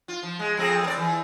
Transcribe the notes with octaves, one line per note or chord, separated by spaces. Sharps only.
F4
F3
G#3
F2 C4 G#4
A#4 D5
E3